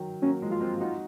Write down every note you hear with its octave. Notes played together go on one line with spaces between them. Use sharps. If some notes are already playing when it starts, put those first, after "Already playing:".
Already playing: D#3 F#3
F#3 A#3 C#4
F3 G#3
F4
G#3 C4
D#4 F#4